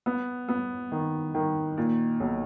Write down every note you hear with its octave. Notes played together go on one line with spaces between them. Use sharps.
B3
B3
D#3
D#3
A#2
B1